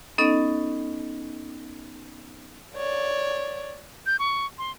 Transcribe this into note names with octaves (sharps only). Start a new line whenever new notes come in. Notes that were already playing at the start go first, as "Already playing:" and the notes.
B3 C#4 D#4 A4 D#5
C#5 D5
G6
C#6
C6